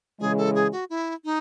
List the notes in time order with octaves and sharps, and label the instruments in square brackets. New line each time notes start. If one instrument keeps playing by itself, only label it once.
[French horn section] C#3 E3 G#3 [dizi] G#4
[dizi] A4
G#4
F#4
E4
D#4